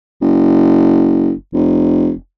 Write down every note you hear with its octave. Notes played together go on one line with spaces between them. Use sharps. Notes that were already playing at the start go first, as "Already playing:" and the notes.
F#1
F1